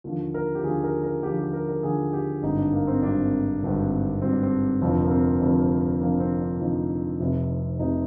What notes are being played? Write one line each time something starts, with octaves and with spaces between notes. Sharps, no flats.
D#2 D3 F3
A#4
G4
D#2 D3 F3 G#4
A#4
A#4
D#2 D3 F3 G4
G4
A#4
A#4
D#2 D3 F3 G#4
G4
G#1 G2 D3 D#4
D4
A#3
C4
G#1 G2 D3 D4
G#1 G2 D3
G#1 G2 D3 C4
D4
C4
F1 F2 D3 F3 C4
A#3
C4
F1 F2 D3 F3
F1 F2 D3 F3 A#3
C4
D4
F1 F2 D3 F3 D#4
F1 F2 C3
F1 F2 C3 D#4